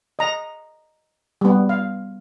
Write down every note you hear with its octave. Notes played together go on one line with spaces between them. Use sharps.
D#5 A#5
G3 B3
F5